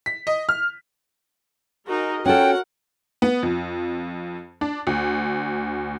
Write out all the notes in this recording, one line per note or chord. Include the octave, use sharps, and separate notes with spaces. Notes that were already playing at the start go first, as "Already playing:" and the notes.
B6
D#5
F6
D#4 F#4 G#4 A#4 D#5
C#4 F4 F#4 A4 A#4 F#5 G5
B3
F2
D4
D2